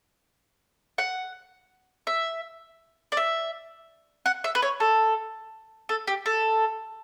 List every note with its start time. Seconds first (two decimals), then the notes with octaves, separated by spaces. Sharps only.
0.98 F#5
2.07 E5
3.12 D5
3.17 E5
4.26 F#5
4.44 E5
4.55 B4
4.62 C#5
4.80 A4
5.89 A4
6.07 G4
6.26 A4